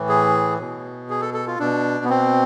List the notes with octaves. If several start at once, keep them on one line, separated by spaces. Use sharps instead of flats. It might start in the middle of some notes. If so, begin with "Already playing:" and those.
Already playing: A2 E3
G#4
B2
G#4
A4
A4
F4
B2 D4
B3
C4